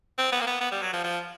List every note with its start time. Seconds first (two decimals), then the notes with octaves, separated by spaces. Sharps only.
0.18 C4
0.32 B3
0.41 A#3
0.47 B3
0.61 B3
0.71 G3
0.82 F#3
0.93 F3
1.04 F3